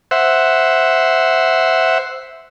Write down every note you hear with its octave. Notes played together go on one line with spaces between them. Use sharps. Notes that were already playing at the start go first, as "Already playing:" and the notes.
C5 E5 F#5